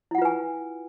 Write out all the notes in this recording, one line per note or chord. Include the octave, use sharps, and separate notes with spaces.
E4 F4 B4 F#5 G#5